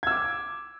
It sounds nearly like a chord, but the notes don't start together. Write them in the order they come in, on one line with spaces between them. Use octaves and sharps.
G#6 E6 D6